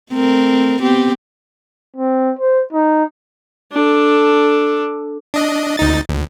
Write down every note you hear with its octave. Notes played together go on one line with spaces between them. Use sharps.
A3 C4 A#4
B3 C4 G4
C4
C5
D#4
D4 A4
D4 D#5
D2 D#4 A6
D2